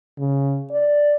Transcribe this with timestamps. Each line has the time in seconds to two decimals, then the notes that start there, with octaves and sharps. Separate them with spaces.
0.19 C#3
0.72 D5